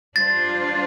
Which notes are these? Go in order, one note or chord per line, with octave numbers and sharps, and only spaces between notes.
G3 D4 F4 C5 A6